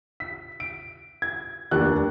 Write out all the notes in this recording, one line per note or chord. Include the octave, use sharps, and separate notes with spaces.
B6
D7
G#6
F1 D#2 D4 F#6